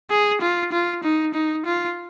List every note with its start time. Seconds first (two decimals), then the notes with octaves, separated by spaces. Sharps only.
0.10 G#4
0.42 F4
0.72 F4
1.04 D#4
1.34 D#4
1.65 F4